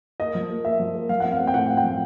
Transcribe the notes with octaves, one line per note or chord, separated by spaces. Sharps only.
A#3 D#5
F3
A#3
A#3 E5
F3
A#3
F3 F5
C4 F#5
F5
C4
G5
A2 F#5
A2
G5
F3